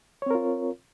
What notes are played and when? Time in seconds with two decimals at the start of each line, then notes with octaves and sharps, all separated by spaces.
0.22 C#5
0.26 C4
0.31 A#4
0.35 F4